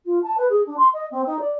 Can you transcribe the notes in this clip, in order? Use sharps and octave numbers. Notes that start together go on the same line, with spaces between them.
F4
A5
B4
G#4
D4
C6
D#5
C4
D#4
D5